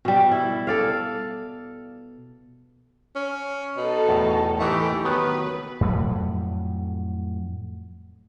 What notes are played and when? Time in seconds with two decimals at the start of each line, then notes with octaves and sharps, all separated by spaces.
0.05 B2 G3
0.31 E4
0.67 A4 D5 F5
3.16 C#4
3.77 B2 D#4 A4
4.09 E2 A2
4.59 E3 A3 D#4 G4 A#4
5.05 D#3 F#3 B3 B4
5.81 F2 A2 F#3 G3